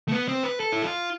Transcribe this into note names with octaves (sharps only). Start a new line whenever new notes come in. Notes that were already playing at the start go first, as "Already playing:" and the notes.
A3
B3
C4
B4
A4
E4
F4